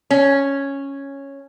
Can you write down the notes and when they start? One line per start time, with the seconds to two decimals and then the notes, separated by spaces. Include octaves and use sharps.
0.10 C#4